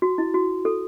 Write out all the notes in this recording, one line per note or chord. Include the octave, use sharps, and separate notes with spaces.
F#4
E4
F#4
A4